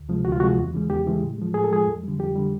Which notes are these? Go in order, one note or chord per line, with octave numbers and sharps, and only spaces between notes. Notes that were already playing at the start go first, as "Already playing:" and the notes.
Already playing: D2
C3 F3 G#3
D2 F#4
F4
C3 F3 G#3 F#4
E2
C#3 E3 G#3
E2 G4
C#3 E3 G#3
A2
F3 G#3
A2 G#4
A4
F3 G#3 G#4
F2
D3 G3
F2 G4
D3 G3